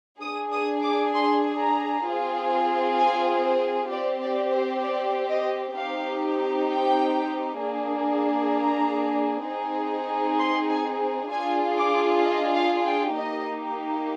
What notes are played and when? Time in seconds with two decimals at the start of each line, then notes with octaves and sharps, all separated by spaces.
0.21 D4 G#4 D#6
0.52 D#6
0.83 D6
1.14 C6
1.60 A#5
2.06 C4 F4 G#4
2.99 G#5
3.45 C5
3.91 C4 G4 D5
4.22 D5
4.53 C5
4.84 D5
5.30 D#5
5.76 C4 D#4 G4 F5
6.69 G5
7.61 A#3 D4 G#4
8.54 A#5
9.46 C4 D#4 G#4
10.39 C6
10.70 G#5
11.32 D4 F4 G#4 G#5
11.78 D6
12.24 D#5
12.55 F5
12.86 G5
13.16 A#3 D#4 G4 D#5